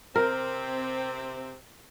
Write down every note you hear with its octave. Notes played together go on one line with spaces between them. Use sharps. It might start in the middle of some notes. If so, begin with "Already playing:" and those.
C3 C4 A#4